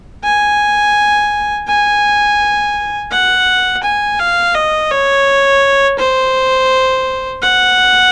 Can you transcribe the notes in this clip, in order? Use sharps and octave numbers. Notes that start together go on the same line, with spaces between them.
G#5
G#5
F#5
G#5
F5
D#5
C#5
C5
F#5